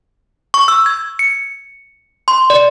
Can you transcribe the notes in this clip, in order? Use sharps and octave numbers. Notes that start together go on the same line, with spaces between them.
C#6
E6
G#6
C#7
C6
D5